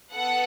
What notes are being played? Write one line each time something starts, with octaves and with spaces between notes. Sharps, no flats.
B3 A4 F#5